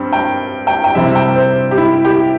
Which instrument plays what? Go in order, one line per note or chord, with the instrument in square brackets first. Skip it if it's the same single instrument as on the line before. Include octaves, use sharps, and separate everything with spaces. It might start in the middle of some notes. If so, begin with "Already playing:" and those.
Already playing: [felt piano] G2 G3 C4
[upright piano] G5
G5
G5
[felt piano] C3 G3 C4 E4 [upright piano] E5
[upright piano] G5
C5
G4
E4
G4